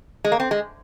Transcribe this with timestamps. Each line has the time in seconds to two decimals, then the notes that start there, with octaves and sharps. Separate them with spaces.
0.24 G#3
0.32 A#3
0.40 C4
0.51 G#3